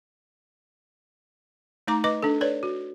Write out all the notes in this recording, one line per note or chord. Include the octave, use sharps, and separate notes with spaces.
A3 D#4 A#5 D6
B4 D#5 D6
D4 A4
B4 C#5 D5
F#4